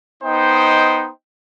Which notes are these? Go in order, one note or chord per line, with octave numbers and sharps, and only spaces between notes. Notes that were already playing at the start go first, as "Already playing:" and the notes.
B3 D#4 C5 D#5 G5